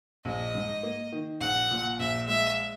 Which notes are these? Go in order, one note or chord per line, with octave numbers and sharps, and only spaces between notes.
A#1 D#5
G#2
A#3
D#3
A#1 F#5
A#2
A#1 E5
G#3 E5